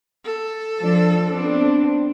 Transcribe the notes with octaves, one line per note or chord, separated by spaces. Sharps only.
A4
F3 D4
B3 C4 D4